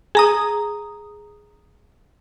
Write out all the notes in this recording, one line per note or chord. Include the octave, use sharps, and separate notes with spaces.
G#4 A#5 D#6